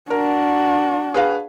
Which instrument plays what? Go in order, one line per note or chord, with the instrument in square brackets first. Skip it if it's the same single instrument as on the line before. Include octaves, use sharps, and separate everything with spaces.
[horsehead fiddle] D4 F#4 [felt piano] A#4
[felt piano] G#4 B4 F5